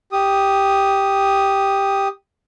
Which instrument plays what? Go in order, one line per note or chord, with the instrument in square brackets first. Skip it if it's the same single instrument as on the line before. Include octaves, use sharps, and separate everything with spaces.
[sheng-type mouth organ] G4 D#6